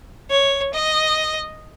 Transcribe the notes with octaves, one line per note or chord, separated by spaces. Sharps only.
C#5
D#5